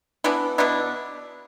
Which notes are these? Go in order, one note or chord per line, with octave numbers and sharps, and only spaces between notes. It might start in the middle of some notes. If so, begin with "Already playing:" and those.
E3 B3 D4 E4
B2 B3 D4 E4